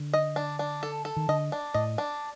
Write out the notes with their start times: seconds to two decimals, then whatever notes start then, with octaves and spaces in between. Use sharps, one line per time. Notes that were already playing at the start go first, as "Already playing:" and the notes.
Already playing: D3
0.13 D#5
0.36 D4
0.59 D4
0.83 A4
1.05 A4
1.17 D#3
1.29 D3 D#5
1.52 D4
1.74 A2 D#5
1.98 D4